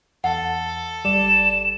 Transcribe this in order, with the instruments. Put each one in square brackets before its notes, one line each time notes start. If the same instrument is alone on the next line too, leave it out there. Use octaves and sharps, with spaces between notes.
[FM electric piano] E2 [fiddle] A4 [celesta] F#5
[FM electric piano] G1 G3 D5 [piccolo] E7